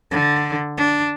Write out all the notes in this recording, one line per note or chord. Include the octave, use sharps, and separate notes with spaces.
D3
D4